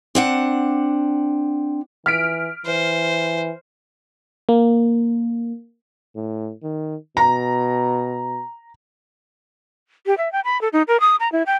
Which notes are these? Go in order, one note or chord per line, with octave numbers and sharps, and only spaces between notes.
C4 D4 F#5
E3 F6 B6 D7
E3 C5
A#3
A2
D#3
B2 A#5
G4
E5
G5
B5
A4
D#4
A#4
D#6
A#5
E4
G5